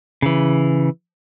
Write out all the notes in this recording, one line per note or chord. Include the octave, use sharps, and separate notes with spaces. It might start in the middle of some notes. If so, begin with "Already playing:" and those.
C#3 E3